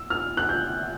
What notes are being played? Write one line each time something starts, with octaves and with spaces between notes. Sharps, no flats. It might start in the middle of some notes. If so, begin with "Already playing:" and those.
Already playing: E6
F6
F#6
G6